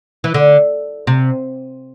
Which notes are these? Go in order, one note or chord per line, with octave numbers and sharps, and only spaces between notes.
E3
D3
C3